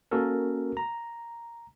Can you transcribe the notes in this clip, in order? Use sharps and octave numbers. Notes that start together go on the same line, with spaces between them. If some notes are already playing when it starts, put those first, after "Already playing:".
A#3 C#4 F#4 A4 A#4
A#5